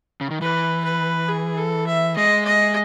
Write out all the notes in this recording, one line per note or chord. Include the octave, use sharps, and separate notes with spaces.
C#3
D#3
E3 B4
B4
G#4
A4
E5
G#3 D#5
D#5